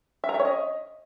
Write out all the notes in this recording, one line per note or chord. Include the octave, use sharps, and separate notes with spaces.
E5
A#5
E5
C#5
D#5